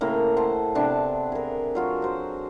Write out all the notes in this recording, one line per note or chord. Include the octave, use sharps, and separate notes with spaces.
A2 C#3 A#3 A#5
C5 F#5 A5
C3 B3 D4 A5
G#4 A#4
F#3 F4 F#4
F#4 C5